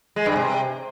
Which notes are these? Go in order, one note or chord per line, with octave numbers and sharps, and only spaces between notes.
G#3
G2
C3